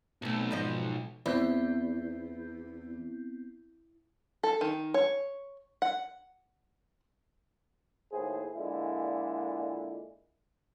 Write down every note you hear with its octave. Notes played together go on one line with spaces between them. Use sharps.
B1 C3 A3
G#2 F3 D#5
E2 B3 C4 G6
A4
D#3
C#5
F#5
D#2 A2 G#4 C5
A#2 D3 G#3 E4